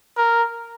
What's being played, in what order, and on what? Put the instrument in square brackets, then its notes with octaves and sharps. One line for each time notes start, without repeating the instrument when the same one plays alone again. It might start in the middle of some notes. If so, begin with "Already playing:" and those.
[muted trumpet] A#4